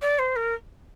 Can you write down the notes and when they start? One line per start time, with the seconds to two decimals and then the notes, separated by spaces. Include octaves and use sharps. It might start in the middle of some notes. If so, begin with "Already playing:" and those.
0.01 D5
0.18 C5
0.35 A#4